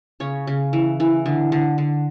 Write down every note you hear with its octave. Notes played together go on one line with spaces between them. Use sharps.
C#3 C#5
C#3
E3
E3
D3
D3
D3